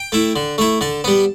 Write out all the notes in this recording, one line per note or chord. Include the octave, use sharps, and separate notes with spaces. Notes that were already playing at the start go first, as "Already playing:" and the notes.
Already playing: G5
A3 E4
D3
A3 E4
D3 A5
G3 B3